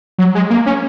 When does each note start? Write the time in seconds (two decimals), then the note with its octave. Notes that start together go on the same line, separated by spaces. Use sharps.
0.18 F#3
0.35 G#3
0.50 A#3
0.66 C#4